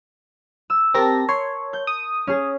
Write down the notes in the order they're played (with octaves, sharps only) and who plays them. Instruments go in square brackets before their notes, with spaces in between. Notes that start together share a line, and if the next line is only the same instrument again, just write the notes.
[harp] E6
[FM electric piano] C4 G4 A#6 [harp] A#4 A5
[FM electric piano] C#5 [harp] C6
[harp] G6
[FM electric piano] D#6
[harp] C#4 G#4